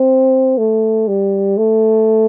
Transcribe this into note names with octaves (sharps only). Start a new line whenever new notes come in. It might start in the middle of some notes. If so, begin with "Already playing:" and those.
Already playing: C4
A3
G3
A3